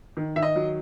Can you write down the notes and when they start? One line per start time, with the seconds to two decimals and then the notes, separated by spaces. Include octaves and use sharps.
0.17 D#3
0.36 D#3 E5
0.42 D#5
0.56 F#3